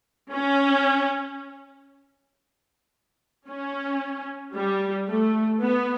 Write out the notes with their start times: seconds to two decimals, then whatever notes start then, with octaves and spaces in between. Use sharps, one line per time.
0.31 C#4
3.49 C#4
4.54 G3
5.08 A3
5.60 B3